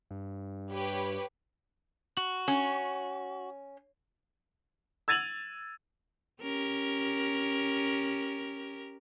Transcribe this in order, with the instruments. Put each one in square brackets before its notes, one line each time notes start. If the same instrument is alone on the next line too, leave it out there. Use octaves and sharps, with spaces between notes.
[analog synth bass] G2
[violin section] G4 B4 C#5
[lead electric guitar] F#4
[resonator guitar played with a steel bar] C#4
[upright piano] E6 G#6 A6 D#7 F7 F#7
[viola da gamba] C#4 G4 A#4